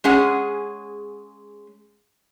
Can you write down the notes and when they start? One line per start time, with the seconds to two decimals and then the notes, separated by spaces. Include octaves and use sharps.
0.04 G#3 C#4 G#4 F#5